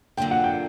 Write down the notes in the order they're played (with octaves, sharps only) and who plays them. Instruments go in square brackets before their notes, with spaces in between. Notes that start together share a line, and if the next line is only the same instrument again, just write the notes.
[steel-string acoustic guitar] D3 F#3 A#3 D4 F4 [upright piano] G5
[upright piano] F#5
G5